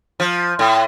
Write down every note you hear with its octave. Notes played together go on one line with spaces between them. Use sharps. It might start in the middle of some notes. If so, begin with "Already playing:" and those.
F3
A2